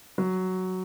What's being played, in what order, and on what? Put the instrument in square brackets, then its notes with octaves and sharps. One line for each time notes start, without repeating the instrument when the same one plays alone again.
[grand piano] F#3